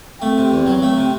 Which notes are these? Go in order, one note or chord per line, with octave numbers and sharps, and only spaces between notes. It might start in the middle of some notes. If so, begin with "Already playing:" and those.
A3 C4
C3
E2
F#3
A3
C3